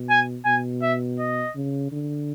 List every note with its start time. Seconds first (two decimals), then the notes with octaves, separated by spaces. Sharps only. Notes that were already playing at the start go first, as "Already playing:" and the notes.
Already playing: B2
0.09 G#5
0.45 B2 G#5
0.82 E5
1.19 D#5
1.55 C#3
1.92 D3